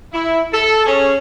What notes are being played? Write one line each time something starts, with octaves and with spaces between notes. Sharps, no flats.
E4
A4
C#4 G#4